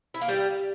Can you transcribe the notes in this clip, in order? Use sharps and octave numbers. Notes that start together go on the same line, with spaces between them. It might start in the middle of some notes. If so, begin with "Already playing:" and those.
E4
A#3
G3